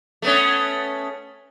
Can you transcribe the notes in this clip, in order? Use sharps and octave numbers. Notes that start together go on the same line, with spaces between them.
A3 B3 C#4